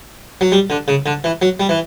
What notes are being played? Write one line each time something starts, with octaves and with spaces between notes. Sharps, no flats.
F#3
G3
D3
C#3
D3
E3
F#3
G3
E3